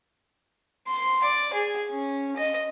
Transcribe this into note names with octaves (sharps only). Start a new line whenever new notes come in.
C6
D5
G#4
C#4
D#5